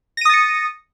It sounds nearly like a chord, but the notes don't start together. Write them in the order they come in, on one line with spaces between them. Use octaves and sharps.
A#6 D#7 D#6 A6 C#7